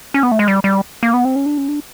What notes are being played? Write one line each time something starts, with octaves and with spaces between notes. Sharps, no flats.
C#4
B3
A3
G#3
G3
G3
A#3
B3
C4
C#4
D4
C#4
D4